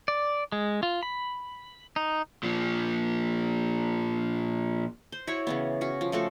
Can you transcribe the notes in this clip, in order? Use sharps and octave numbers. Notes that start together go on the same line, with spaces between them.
D5
G#3
F4
B5
D#4
A#2 F3
C5
E4 F#4 C#5
C#3 E3 B3
C#4 F#4
F3
F3 A3 F#4 A4